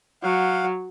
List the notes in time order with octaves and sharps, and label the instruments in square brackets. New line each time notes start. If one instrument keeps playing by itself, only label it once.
[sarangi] F#3 [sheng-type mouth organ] F5 F#5